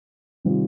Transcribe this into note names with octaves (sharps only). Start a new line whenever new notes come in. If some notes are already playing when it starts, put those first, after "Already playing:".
C3 D#3 G3 C4 F4